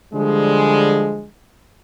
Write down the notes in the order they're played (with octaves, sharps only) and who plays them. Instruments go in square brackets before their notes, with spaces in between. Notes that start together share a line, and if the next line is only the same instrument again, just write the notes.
[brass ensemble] D3 F3 G3 G#3